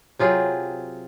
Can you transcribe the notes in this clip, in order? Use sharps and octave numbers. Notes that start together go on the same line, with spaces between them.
C3 F#3 C4 F4 G#4